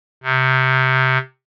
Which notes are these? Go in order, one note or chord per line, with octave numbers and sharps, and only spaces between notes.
C3